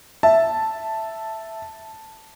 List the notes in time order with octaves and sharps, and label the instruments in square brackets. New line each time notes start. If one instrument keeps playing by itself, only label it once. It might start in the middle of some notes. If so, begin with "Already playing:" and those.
[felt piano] E5 [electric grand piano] A5